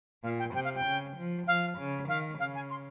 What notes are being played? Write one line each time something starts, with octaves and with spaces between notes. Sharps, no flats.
A#2 F5
G5
C3 G5
F5
G5
C#3
F3
F3 F5
C#3
D#3 F5
C#3 F5
G#5
C6